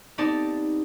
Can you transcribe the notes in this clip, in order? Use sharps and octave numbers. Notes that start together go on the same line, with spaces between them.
B3 C4 D#4 G4 D5 A5